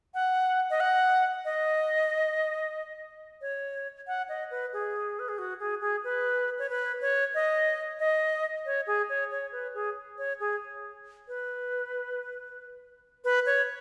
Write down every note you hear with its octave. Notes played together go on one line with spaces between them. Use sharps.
F#5
D#5
F#5
D#5
C#5
F#5
D#5
B4
G#4
B4
G#4
F#4
G#4
G#4
B4
C#5
B4
C#5
D#5
D#5
C#5
G#4
C#5
C#5
B4
G#4
C#5
G#4
B4
B4
C#5